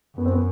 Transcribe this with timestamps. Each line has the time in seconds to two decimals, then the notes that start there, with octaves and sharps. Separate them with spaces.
0.18 F#2 B3
0.26 C4
0.33 B3